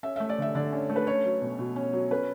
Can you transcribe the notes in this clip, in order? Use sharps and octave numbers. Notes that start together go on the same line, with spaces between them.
C#4 E5
E5
A3
D5
D3 E5
D3 D5
C#4
A3
B4
C#4 C#5
F#3
B2
B2
C#4
F#3
C#4 B4